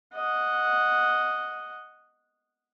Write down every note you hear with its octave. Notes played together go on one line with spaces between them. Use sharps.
D#5 F#5